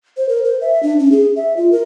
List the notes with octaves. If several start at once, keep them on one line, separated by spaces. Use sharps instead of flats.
C5
A#4
C5
E5
D4
C#4
G#4
E5
F4
A#4